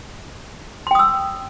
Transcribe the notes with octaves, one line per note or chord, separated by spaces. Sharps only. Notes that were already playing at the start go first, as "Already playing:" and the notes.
G5 C6 D#6 E6